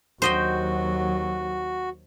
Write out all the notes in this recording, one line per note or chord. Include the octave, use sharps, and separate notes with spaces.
D#2 F#3 F#4 C5 D#5 G5